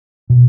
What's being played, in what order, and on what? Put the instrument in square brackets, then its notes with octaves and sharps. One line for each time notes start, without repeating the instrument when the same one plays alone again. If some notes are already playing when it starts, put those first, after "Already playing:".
[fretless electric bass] B2